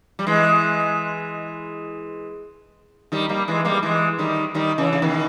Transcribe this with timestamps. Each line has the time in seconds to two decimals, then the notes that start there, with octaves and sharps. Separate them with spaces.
0.19 G3
0.27 E3 G#3
3.12 D#3 G3
3.29 G3 A#3
3.48 E3 G#3
3.65 G3 A#3
3.83 E3 G#3
4.18 D#3 G3
4.55 D#3 G3
4.78 C#3 E3
4.93 C#3
5.02 B2 D#3